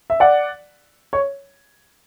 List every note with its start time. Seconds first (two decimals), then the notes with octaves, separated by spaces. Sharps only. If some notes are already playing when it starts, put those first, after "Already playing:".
0.10 E5
0.20 D5 F#5
1.13 C#5